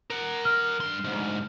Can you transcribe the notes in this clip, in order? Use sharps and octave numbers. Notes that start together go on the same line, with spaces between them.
A#4 F#5
F6
G2 C6
D2 G#2